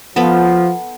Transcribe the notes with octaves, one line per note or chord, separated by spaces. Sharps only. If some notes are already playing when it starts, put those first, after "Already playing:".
F3 B3 A4 B4